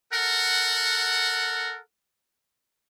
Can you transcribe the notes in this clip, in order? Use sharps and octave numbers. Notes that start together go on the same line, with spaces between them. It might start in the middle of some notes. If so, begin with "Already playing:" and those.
A4 A#4 F#5